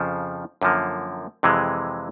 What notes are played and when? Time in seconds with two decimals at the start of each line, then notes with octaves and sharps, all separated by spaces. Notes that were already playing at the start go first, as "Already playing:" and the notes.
Already playing: F2 C#3 F3
0.62 F#2 D3 F3 A#3
1.43 F2 C3 E3 G#3